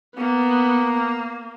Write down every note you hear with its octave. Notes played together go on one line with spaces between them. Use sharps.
A#3 B3